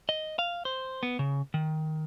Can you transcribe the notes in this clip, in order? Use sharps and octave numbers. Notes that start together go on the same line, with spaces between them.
D#5
F5
C5
B3
C#3
D#3